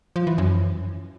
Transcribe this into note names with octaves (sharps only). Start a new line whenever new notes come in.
F3
E3
F#2